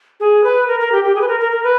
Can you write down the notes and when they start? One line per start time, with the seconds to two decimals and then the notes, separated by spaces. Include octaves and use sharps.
0.20 G#4
0.44 B4
0.68 A#4
0.80 A#4
0.92 G4
1.04 G4
1.15 G#4
1.21 B4
1.28 A#4
1.40 A#4
1.52 A#4
1.64 B4